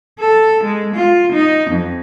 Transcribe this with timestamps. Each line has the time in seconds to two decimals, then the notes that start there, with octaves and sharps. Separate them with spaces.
0.19 A4
0.64 G#3
0.95 F4
1.32 D#4
1.71 F2